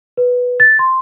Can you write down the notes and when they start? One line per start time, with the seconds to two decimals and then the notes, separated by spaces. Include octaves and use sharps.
0.17 B4
0.60 A6
0.79 C6